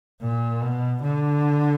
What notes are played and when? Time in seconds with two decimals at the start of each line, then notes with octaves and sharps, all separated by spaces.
0.22 A#2
0.62 B2
1.03 D3